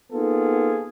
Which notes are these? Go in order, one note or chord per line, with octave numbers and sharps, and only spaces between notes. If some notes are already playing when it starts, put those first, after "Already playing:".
A#3 B3 D#4 F4 G#4 A4